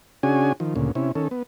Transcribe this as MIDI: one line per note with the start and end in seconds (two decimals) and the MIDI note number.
0.23 0.53 49
0.23 0.53 61
0.23 0.53 62
0.23 0.53 66
0.23 0.53 68
0.23 0.53 80
0.60 0.74 51
0.60 0.74 53
0.76 0.92 38
0.76 0.92 46
0.76 0.92 49
0.95 1.12 48
0.95 1.12 61
0.95 1.12 64
1.15 1.28 51
1.15 1.28 61
1.15 1.28 69
1.31 1.43 59